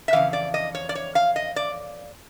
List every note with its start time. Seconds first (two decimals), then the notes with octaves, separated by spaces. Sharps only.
0.08 E5
0.13 F2 C#3 E3 F5
0.33 D5
0.54 D#5
0.75 C#5
0.89 D5
0.95 C#5
1.15 F5
1.36 D#5
1.56 D5